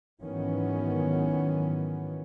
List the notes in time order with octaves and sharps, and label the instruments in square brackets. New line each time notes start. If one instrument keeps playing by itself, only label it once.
[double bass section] G#2 D#3 E3 F#3 B3 C#4